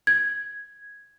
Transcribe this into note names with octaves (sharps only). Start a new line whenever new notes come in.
G#6